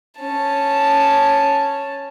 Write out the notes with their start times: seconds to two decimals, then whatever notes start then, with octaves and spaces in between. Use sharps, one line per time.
0.20 C#4 A5